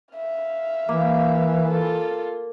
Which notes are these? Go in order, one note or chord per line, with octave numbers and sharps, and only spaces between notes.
E5 F5
E3 A#3
F4 A4